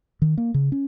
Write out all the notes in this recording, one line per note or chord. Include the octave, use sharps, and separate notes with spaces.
D#3
A#3
C#3
C#4